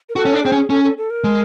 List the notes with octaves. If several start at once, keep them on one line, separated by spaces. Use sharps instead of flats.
A#4
F#4 A4
C#4
D4
C4 G#4
C#4
C#4 A4
A4
A4
A#4
G#3